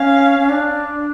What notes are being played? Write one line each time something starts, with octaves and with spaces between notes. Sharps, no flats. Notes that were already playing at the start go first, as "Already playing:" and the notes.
Already playing: C#4 F5
C#4
D4